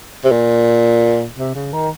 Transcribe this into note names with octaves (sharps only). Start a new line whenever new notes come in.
C3
A#2
C3
C#3
D#3